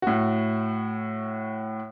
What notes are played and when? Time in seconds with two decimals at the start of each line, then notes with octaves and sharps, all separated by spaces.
0.02 A2 F#4